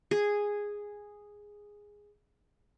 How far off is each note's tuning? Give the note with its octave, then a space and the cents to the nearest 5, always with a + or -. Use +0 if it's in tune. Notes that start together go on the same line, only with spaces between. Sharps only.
G#4 -5